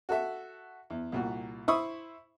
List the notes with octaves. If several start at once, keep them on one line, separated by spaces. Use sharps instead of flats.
F#4 A4 E5
E2
C2 A#2 F#4
E4 C5 B5 C#6 D#6 E6